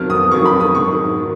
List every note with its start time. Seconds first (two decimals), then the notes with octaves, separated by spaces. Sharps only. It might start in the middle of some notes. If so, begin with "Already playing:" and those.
Already playing: F2 D#3 F#3 F6
0.10 D#6
0.31 F2 D#3 F#3 C#6
0.46 B5
0.60 D#6
0.75 G#2 D#3 F#3 C#6
1.17 D#3 F#3